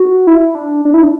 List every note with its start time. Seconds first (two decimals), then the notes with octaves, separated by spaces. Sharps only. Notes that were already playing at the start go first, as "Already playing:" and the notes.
Already playing: F#4
0.27 E4
0.55 D4
0.85 D4
0.94 E4
1.03 D4